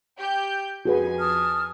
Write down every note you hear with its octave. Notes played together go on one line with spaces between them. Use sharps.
G4 G6
F2 F#4 G#4 B4 G#5
A5 D#6 F6